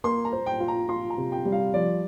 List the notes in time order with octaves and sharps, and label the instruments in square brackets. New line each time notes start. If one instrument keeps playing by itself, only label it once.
[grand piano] A#3 [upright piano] C6
[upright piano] A#5
[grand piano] C5
[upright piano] G5
[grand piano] F4
[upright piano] A#5
[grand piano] F4 [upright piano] C6
[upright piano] A#5
[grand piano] C3
[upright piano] G5
[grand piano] G3
[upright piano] F5
[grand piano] F3 [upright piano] D5